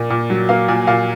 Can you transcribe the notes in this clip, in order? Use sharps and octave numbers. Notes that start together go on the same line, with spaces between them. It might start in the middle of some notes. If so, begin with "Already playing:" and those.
Already playing: A#2 A#3 D5
A#2
F#3
A#3 F5
A#2 G#5
A#2 F5